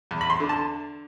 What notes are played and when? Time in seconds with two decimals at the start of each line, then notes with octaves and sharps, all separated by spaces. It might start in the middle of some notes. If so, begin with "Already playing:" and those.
0.11 E2
0.21 B5
0.30 C6
0.40 D3
0.49 A5